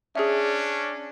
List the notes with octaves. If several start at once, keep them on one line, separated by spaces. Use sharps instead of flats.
C#4 D4 G#4 E5